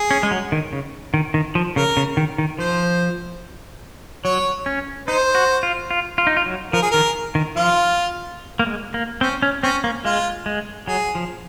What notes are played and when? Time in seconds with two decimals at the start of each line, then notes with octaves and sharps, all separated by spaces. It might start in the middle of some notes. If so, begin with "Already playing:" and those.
Already playing: G#4
0.11 C#4
0.23 G#3
0.31 F#3
0.52 D#3
0.73 C#3
1.14 D#3
1.34 D#3
1.55 F3
1.76 C#3 A#4
1.97 C#3
2.17 D#3
2.38 D#3
2.59 F3 C5
4.25 F#3 C#5
4.66 C#4
5.08 D#4 C5
5.35 F#4
5.63 F4
5.91 F4
6.18 F4
6.27 D#4
6.37 F4
6.46 F#3
6.73 F3 A#4
6.82 G#4
6.91 D#3 A#4
7.35 D#3
7.56 F3 F4
8.59 A#3
8.66 G#3
8.94 A#3
9.21 C4 C#4
9.42 C#4
9.63 C4 C#4
9.84 A#3
10.05 G#3 F4
10.46 G#3
10.88 F#3 G#4
11.15 F3